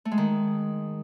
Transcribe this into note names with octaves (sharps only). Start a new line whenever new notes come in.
A3
G#3
D#3